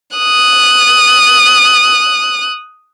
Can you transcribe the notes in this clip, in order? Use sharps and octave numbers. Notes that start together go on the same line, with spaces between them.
D#6 F#6